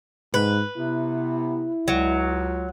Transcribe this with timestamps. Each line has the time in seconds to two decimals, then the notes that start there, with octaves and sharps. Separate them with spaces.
0.34 G#2 B4
0.77 C3 B3 E4
1.88 C#2 F#3